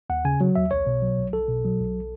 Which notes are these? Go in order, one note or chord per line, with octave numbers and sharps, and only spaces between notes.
D#2 F#5
C#3 G#5
F#3
D#2 E5
B1 C#5
B2
F#3
B1
B1 A4
B2
F#3
B1